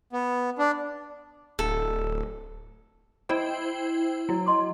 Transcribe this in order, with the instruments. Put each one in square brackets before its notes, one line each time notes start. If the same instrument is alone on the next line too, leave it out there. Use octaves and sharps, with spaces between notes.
[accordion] B3
D4
[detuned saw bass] D1 [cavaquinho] A4
[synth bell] E4 C5 G5 [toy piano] D#5 D#6
[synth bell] F#3 [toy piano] E4
[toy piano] D#5 C6 D6